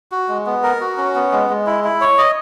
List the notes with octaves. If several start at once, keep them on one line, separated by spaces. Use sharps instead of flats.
F#4
G#3
B3
A#4
F#4
C#4
B3
G#3
G#3
E4
E4
C#5
D#5